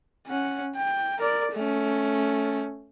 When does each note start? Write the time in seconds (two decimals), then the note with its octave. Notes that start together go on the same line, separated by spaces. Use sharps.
0.27 C#4 F#5
0.76 G5
1.19 A#4 D5
1.53 A3 C#4